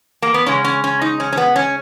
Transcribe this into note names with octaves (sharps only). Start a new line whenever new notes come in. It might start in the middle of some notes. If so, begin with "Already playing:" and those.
A#3
B3
C#3 G#3 C#4
C#4
C#4
D#4
C#4
C#4
B3
C#4